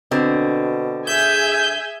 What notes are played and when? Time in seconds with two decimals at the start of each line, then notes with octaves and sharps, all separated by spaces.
0.11 B2 D3 C4
1.07 G#4 E5 G#5 G6